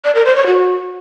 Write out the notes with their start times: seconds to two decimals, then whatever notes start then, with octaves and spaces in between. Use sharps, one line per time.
0.05 D5
0.15 A#4
0.25 C5
0.36 C#5
0.46 F#4